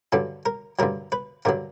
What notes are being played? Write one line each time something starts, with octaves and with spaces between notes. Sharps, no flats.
G2 D3 F#3 A4
A#4
G2 D3 F#3 A#4
B4
G2 D3 F#3 A#4